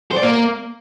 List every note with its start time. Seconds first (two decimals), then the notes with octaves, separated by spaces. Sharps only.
0.11 C5
0.17 D5
0.23 A#3